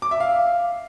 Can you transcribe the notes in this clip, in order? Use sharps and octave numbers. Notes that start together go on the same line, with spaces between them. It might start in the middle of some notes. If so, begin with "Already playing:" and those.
D6
E5
F5